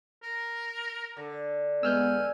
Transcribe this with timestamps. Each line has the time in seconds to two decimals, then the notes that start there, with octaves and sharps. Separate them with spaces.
0.23 A#4
1.17 D3
1.83 G#3 B3 G#5 E6 F6 G6